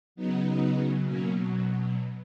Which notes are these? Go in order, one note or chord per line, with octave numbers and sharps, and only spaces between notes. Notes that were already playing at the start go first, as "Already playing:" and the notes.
C#3 F#3 B3 D#4
B2 F#3 A#3 C#4